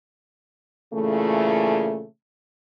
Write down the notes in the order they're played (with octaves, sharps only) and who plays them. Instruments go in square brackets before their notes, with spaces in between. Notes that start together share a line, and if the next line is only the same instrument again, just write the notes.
[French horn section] A#2 C#3 E3 A3